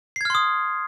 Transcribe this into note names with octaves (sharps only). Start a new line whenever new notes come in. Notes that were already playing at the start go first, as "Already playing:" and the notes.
C6 D#6 F6 G#6 C7